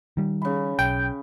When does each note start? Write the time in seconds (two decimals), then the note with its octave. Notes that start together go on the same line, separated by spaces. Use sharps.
0.17 D#3 G3
0.42 C#3 B5
0.79 B1 G5